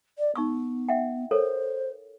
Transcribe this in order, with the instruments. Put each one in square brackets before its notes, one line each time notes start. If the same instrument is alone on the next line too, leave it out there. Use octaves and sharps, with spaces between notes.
[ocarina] D5
[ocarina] B3 [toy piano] D#4 C#6 E6
[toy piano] E5 F#5 G5
[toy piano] A4 A#4 C#5 [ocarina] C5